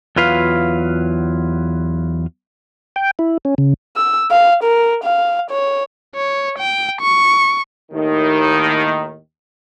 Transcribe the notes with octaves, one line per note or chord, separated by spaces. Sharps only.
E2 F#3 F4 B4 F5
G5
E4
C#4
C#3
E6
F5
A#4
F5
C#5
C#5
G5
C#6
D#2 A2 D#3